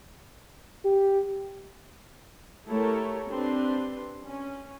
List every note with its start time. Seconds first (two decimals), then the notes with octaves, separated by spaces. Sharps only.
0.85 G4
2.68 A3 E4 G4 A4 A#4 C#5
3.30 C4 D4 G4 B4 C6
4.25 C#4